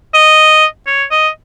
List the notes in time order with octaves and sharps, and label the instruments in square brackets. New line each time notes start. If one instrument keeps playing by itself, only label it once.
[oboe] D#5
C#5
D#5